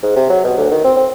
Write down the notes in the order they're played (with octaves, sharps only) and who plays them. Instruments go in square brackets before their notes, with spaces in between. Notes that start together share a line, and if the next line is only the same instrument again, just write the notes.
[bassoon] G#2
C3
F#3
B2
D2
D#3
C4
C4